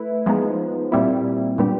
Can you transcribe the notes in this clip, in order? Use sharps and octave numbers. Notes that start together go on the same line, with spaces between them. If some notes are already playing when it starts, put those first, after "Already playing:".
Already playing: A3 E4 B4
F3 G#3 B3 D#4
A#2 G3 C4 E4
A#2 G3 B3 D4 G4